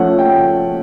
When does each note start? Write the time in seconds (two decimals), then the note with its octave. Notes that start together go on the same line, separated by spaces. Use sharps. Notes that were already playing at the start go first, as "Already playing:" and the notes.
Already playing: F3 A3 C#4 F#5
0.19 G5